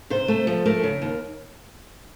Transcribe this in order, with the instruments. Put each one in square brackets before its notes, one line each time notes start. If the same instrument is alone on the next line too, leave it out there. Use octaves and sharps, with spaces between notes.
[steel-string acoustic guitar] C3 C5
A3
F3
A3 A#4
C#3
D#2